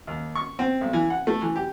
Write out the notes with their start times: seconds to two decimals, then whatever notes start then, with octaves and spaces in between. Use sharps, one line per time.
0.07 D#2
0.35 C#6
0.59 C4
0.81 B1
0.93 E3
1.10 F#5
1.27 A3
1.42 E3
1.56 G4